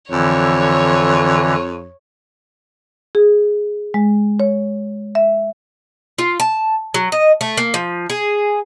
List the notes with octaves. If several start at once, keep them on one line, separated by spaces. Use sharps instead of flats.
F2 D3 E3 C#5
G#4
G#3
C#5
E5
F4
A5
F#3
D#5
A3
A#3
F3
G#4